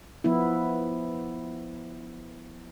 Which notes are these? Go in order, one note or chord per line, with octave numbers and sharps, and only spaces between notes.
F3 B3 E4